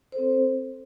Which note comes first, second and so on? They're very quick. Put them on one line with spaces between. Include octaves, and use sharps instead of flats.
C5 A4 C4